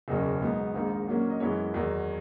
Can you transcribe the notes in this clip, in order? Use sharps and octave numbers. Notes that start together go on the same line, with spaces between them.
F#1 E2 B2 F#3 C#4 D#5
G#2 F#3 B3 D#4
A#1 G#2 D#3 A#3 D#4
A#2 F#3 A#3 C#4
D#5
F#2 E3 G#3 B3 C#5
E2 D#3 F#3